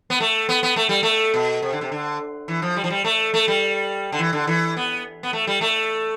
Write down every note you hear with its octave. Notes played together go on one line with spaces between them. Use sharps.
B3
A3
B3
B3
A3
G3
A3
B2
C3
D3
C3
D3
E3
F3
G3
F3
G3
A3
A3
G3
D3
E3
D3
E3
B3
B3
A3
G3
A3